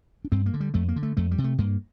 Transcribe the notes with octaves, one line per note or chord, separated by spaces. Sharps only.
D4
G2 C4
A#3
D3
G3
F2 A3
A#3
D3
A3
F2 A3
G3
C3
A3
G2 A#3